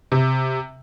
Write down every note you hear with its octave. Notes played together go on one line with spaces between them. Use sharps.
C3